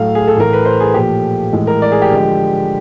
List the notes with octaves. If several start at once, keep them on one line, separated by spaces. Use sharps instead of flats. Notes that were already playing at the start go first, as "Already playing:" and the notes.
Already playing: A2 F#3 A3 F5
G#4
A4
A2 E3 A3 A#4
B4
C5
G#4
A#2 F3 A3 G4
A2 E3 G#3
A#4
D5
G#4
G4
D3 F3 G#3